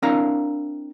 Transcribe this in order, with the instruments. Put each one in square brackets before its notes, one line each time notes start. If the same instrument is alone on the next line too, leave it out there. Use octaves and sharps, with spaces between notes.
[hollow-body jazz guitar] C4 D4 E4 A#4 F5 A#5